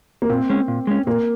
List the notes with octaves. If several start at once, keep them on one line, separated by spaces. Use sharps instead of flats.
A#3
A#2 C4
G#3 C#4
A#2
G#3 C#4
A#2 A#3